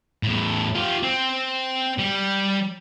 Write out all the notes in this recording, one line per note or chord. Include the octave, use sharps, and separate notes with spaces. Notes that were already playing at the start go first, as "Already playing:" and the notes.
E2 A2
F4 G4
C4
G3